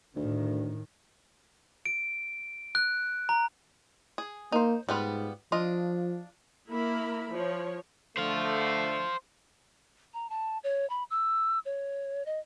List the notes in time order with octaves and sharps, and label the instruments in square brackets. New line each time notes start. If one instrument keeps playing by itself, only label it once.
[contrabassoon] D2 [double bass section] A2 D#3
[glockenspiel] D7
F#6
A#5
[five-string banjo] G#4
[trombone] A#3 [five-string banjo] D#4 C5
[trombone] G#2 [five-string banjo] G3 B3 F4
[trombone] F3 [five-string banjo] D4 F4 D#5
[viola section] A#3 E4 A#4 B5
F3 C#5
[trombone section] D3 A3 [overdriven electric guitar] C5 F5
[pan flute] A#5
A5
C#5
B5
E6
C#5
D#5